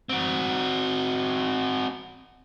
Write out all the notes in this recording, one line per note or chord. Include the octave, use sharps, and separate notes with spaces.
C4 F#4